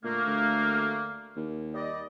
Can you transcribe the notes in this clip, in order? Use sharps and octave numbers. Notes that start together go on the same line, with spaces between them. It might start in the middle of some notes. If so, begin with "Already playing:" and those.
A#2 D3 A3 A#3
D2
D#2
G3 D5 D#5